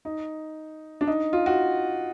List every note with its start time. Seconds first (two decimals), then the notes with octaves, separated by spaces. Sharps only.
0.05 D#4
1.01 D4
1.07 D#4
1.33 F4
1.46 F#4